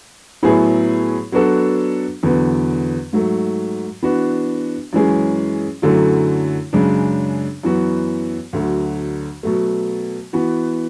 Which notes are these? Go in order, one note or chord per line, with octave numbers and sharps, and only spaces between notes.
A2 F#3 B3 E4 G#4
F#3 B3 D4 F#4 A4
E2 D3 F#3 B3
G#2 F#3 A3
E3 B3 D4 F#4
F#2 E3 G#3 C#4 G#4
F#2 D3 F#3 A3 E4
F#2 C#3 G#3 D4
F#2 E3 B3 F#4
D2 D3 F#3
B2 F#3 A3
E3 B3 F#4